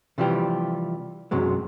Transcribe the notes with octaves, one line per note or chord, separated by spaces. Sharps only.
C3 E3 F3 G3 G4
B1 F#2 C3 F#3 G#3